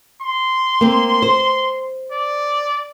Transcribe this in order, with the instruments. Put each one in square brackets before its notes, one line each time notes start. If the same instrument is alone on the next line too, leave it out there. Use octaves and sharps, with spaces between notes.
[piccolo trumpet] C6
[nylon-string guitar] A#3 C4
C5
[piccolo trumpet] D5